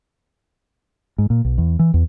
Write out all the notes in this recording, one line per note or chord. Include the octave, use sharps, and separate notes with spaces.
G#2
A#2
B1
E2
E3
E2